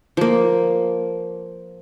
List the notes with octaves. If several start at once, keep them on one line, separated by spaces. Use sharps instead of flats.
F3 A#3